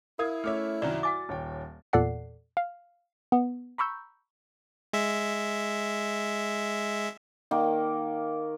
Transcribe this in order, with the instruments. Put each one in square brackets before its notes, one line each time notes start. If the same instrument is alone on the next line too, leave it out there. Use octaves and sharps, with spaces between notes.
[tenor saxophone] E4 [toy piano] A#4 [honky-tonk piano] F5 D#6 G#6
[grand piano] A3 C#4 C#5 [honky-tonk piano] E5 D6 F6
[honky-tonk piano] C2 F#2 D#3 [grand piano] F#4 [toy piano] D5
[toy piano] F#5 G#5 D6 [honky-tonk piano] A6
[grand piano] D#1 C#5 G5
[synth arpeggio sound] E2 A#2 A4 D5 F#5 C7
F5
B3
A#5 B5 C#6 E6 G6
[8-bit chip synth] G#3 E5
[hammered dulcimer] D#3 A#3